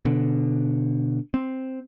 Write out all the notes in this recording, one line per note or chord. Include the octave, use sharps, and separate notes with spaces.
B2 D3
C4